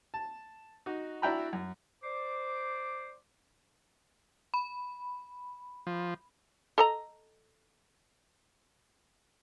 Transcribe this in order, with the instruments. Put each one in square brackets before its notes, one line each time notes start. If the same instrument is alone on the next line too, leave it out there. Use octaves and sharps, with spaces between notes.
[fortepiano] A5
D#4 F#4
D4 E4 F#4 G5 A#5 B5
F#2
[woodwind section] C5 D5 D6
[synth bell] B5
[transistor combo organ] F3
[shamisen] A4 D#5 A#5